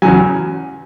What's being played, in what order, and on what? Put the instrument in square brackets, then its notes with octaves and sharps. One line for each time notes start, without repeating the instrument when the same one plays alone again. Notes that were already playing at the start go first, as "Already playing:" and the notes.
[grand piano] E2 C#3 F#3 G#5